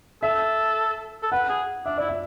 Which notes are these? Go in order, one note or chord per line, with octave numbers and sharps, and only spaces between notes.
A4 E5
A4
B4 F#5
G#4
D4 E5
E4 D5
E5